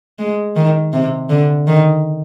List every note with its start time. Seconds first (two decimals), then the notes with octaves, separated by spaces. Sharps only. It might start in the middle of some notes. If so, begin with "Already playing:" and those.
0.19 G#3
0.56 D#3
0.93 C3
1.30 D3
1.68 D#3